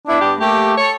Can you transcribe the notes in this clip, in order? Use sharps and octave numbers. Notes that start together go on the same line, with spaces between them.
B3 D4 E4
G2 B3 G4
A3 A#3 G4
A4 C#5